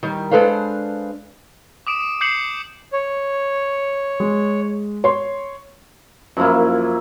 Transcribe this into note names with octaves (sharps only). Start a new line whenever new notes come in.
D#3 G3
G#3 D4 A4 B4 C5 F5
D6 D#6 D7 E7
D6 G6 C7 C#7 F#7
C#5
G#3
C#5 C6
F#2 F3 A#3 E4